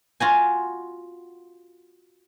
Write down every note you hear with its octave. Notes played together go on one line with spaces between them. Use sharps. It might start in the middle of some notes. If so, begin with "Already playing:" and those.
F4 F#4 G#5